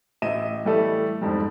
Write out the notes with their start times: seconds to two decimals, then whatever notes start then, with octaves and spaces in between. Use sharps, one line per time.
0.22 A1 D#5 E5 D#7
0.65 E3 G3 A3 E4 A4
1.21 F2 G#2 G3